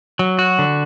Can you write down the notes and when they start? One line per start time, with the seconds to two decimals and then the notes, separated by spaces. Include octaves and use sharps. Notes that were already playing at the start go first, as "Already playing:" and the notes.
0.19 F#3
0.39 F#4
0.59 D3